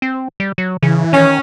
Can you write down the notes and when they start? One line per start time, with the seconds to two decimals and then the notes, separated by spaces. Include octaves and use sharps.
0.02 C4
0.40 G3
0.58 F#3
0.83 C#3 E3
1.13 D#3 C#4